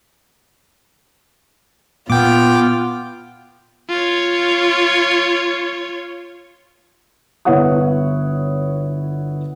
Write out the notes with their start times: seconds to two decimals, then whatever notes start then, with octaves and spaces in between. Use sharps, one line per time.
2.10 A#2 B3 F4 G5 D6
3.89 F4 C#5
7.45 G1 B3 E4 C#5 F#5 D#6